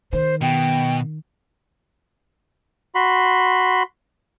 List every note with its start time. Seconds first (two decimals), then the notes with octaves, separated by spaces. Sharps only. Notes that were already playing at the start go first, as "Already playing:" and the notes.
0.13 D#3 C5
0.42 B2 G5
2.95 F#4 B5 C6